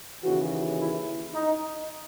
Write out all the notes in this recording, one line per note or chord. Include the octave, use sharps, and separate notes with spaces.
D#2 C#3 E3 F#4
E4
D#4